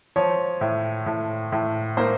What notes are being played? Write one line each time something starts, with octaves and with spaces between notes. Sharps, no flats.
F3 C#5
A2
A2
A2
A#3 C5